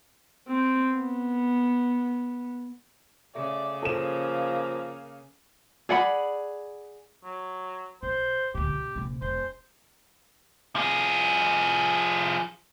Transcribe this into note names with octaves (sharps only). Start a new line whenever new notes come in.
C4
B3
C#3 A3 D5
F3 A#3 A4 E7
G#4 D5 F#5 B5
F#3
B1 C5
D2 A#2 G4
B2
D#1 C3
E1 C5
F3 G#4